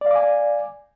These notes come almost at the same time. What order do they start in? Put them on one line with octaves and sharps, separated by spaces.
D5 F5 D6 G#5